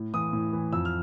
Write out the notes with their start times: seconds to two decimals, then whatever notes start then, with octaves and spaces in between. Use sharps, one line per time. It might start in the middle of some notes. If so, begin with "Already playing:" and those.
Already playing: A2
0.14 E3 D#6
0.33 A2
0.53 E3
0.72 F2 E6
0.85 F6